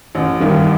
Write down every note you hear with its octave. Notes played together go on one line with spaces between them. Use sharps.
A1
G2 D#3